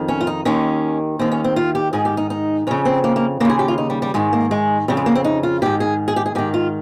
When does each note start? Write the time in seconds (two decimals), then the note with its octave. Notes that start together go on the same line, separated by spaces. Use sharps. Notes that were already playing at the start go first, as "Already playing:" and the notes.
Already playing: F2 D#3
0.08 C#4
0.21 F4
0.27 D#4
0.45 D#2 D#3 C#4
1.19 D#2 D#3 C4
1.32 C#4
1.44 C4
1.56 F4
1.75 G4
1.93 G#2 D#3 G#4
2.05 G4
2.17 D#4
2.30 D#4
2.67 F2 C#3 C#4
2.85 C4
3.04 A#3
3.16 A#3
3.40 C#3 A#3
3.45 D#2 G#4
3.59 G4
3.68 F4
3.78 D#4
3.90 G3
4.02 G3
4.14 G#2 D#3 G#3
4.33 A#3
4.51 G#3
4.88 F2 C#3 G3
4.97 G#3
5.06 A#3
5.15 C4
5.24 D#4
5.43 F4
5.62 G#2 D#3 G4
5.80 G#4
6.08 G#4
6.16 G4
6.26 G#4
6.35 G#2 D#3 G4
6.54 F4